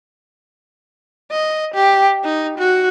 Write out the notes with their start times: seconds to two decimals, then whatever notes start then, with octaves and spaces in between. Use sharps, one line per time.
1.31 D#5
1.74 G4
2.24 D#4
2.58 F#4